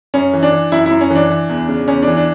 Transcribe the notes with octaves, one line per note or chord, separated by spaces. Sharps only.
F#2 C#4
E3
D4
E3
F#2 E4
E4
F#2
C#4
E3 D4
E3
E2
C#3
E2 C#4
E3 D4
D4